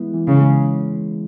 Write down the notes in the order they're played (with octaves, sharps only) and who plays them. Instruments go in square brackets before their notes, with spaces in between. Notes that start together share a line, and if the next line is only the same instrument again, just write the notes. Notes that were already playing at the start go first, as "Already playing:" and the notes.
Already playing: [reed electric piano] E3 G#3 B3 E4
E3
[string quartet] C#3
[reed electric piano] G#3